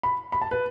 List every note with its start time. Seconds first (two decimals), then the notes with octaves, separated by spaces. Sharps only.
0.03 B5
0.32 B5
0.41 A5
0.51 B4